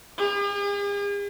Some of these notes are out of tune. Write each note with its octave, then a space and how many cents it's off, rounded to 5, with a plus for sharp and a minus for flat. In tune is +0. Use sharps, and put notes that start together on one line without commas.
G#4 -45